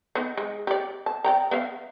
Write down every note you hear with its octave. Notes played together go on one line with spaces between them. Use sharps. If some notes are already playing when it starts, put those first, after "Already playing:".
B3 D#4
G#3
G4 D5
A5
D5 G5 A#5
B3 E5 F5